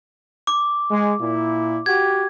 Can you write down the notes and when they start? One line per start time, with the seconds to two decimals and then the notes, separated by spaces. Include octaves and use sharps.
0.47 D6
0.91 G#3
1.20 A#2 E4
1.86 F#4 G4 G#6